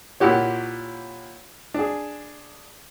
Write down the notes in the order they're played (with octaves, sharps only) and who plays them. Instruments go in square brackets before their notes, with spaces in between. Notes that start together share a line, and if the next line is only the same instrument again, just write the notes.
[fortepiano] A#2 A#3 E4 F#4 G4 C#5
D4 G#4